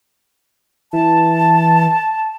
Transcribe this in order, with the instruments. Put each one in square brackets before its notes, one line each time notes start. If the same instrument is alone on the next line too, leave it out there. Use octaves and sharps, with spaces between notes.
[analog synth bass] E3 [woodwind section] A5